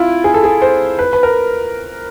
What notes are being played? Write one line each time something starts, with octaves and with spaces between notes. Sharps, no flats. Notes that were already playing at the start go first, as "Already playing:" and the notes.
Already playing: E4 F4
G#4
A4
G#4
C5
B4
B4
A#4